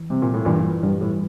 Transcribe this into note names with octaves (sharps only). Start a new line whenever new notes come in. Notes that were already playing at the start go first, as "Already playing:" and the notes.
Already playing: E3
C3 G3
A#2
A2
G2 A#2 E3
G2 G3
A2